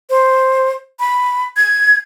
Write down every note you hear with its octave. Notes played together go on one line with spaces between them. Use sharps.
C5
B5
G#6